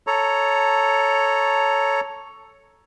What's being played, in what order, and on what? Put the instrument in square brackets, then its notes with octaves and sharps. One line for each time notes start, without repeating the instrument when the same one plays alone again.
[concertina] A4 C#5 A#5